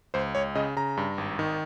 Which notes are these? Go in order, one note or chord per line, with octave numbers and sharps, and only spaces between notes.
C#2 C5
C#2 C#5
C#3 D#5
C#3 A#5
G2
G#1
D#3